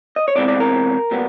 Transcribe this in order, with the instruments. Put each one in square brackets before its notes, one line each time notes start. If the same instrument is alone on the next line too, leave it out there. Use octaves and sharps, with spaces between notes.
[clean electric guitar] D#5
C#5
E2 C3 E3 G#3 C4 D5
D5
A#4
A#2 G3 B3